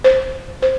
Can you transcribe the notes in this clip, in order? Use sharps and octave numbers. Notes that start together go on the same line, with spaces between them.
C5
C5